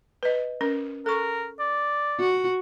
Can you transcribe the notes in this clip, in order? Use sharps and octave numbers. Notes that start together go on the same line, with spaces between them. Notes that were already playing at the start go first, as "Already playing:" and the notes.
B4 D#5
C#4 A#4
A4 A#4 C#6
D5
F#4